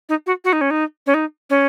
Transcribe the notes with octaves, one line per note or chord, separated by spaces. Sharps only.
D#4
F#4
F#4
D#4
C#4
D#4
C#4
D#4
C#4